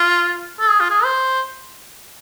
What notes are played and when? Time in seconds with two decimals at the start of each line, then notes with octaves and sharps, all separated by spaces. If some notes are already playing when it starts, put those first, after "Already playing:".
Already playing: F4
0.60 A4
0.70 G#4
0.80 F4
0.90 G#4
1.04 C5